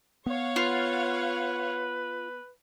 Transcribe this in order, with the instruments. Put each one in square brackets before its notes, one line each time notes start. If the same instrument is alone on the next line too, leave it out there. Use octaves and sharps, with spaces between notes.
[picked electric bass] B3 [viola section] C#5 F5 F#5
[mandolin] F4 [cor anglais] B4